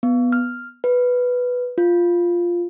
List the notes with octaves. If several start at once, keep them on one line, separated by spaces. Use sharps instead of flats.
B3
F6
B4
F4